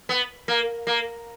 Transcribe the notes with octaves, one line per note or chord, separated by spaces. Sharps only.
B3
A#3
A#3